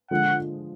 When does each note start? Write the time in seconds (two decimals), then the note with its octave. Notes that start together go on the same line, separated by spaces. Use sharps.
0.11 D3 F3 G#3 F#5